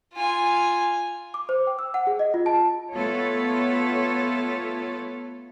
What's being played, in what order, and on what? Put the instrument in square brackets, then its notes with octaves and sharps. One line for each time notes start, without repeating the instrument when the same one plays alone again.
[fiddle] F4 G#5
[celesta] D6
C5
G5
E6
F#5
G#4
D#5
F4
A5
[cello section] A3 B3 F4 A4 C#5